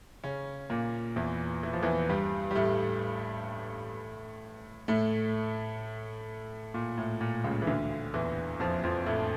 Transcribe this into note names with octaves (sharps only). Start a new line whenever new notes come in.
C#3 C#4
A#2 A#3
E2 E3
E3
F3
E2 E3
G2 G3
G3
A2 A3
A2 A3
A#2
A2
A#2
C#2 C#3
E3
D2 D3
E2 E3
F2 F3
F2 F3
A2 A3